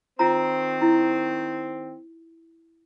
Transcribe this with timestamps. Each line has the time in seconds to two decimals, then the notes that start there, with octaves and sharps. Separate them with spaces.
0.19 D#3 C4 F4 A#5
0.81 E4